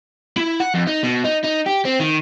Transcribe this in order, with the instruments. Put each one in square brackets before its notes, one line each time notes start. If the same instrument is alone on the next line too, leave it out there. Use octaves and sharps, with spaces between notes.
[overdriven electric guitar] E4
F#5
F2
D#4
B2
D#4
D#4
G4
C4
D#3